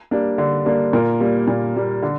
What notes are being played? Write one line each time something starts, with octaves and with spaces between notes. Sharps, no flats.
G3 A#3 D4
D3
G3 A#3 D4
A#2 A#4
G3 A#3
A#2
G3 A#3
D3